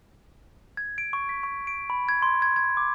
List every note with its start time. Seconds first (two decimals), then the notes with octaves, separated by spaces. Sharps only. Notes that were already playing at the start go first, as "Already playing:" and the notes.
0.77 G#6
0.98 D7
1.13 C#6
1.29 B6
1.43 C#6
1.67 D7
1.90 B5
2.09 G#6
2.22 C6
2.42 G#6
2.56 G#6
2.77 D6